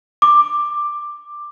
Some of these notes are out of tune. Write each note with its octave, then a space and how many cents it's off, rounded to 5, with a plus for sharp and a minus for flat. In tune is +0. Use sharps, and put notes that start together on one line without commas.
D6 +10